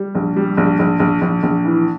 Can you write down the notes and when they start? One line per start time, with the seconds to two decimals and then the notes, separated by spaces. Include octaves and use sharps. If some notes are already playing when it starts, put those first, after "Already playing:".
Already playing: G3
0.15 A#1
0.36 G3
0.57 A#1
0.79 A#1
1.00 A#1
1.21 A#1
1.43 A#1
1.65 E3